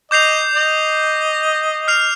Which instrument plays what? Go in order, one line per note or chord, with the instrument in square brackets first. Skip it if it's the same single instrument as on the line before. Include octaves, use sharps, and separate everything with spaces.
[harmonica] D#5 [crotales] D6 G6 C7 F7
[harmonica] D#5
[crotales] F6 C7 F7